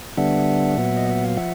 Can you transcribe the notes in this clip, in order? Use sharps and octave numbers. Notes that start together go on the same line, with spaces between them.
D3 G3 B3 D4 E5 F#5
A#2 F#3 B3
D#5
E5
F5
F3 E5 F#5